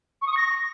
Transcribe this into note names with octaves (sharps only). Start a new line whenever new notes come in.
C#6
D#6
C#6
A#6